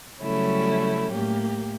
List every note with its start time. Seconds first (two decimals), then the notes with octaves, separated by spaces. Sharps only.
0.21 C#3 F#3 G3 A3 C#4 E4
1.12 A2 A#3 G4